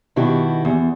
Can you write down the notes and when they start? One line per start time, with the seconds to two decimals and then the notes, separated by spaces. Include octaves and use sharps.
0.16 B2 D#3 E4 F#4 G4
0.65 E2